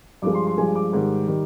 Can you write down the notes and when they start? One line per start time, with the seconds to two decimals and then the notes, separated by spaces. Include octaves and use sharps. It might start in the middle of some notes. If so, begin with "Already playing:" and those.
0.22 G2 F3 G#3 D6
0.34 C6
0.46 C6
0.58 G2 F3 G#3 G#5
0.75 D6
0.93 G#2 D#3 G3
1.28 D#3 G3